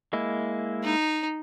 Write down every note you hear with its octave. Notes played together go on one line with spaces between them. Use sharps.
G#3 A#3 E4
D#4